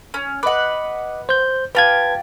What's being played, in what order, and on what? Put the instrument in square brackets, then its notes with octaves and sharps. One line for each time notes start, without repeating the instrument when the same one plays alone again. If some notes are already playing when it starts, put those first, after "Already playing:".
[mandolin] C#4
[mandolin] B4 F#5 [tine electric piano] D#5 D6
[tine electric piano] C5 G6
[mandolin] F4 G4 [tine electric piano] B4 A5 G#6